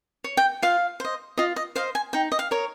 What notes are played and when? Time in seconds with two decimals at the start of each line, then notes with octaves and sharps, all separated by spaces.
0.24 C#5
0.37 G5
0.62 F4 F5
1.00 C5 D#5
1.38 F4 D#5
1.56 D#5
1.76 C5 D#5 F5
1.95 G#5
2.13 D#4 G5
2.32 D#5
2.39 F5
2.51 A#4 C#5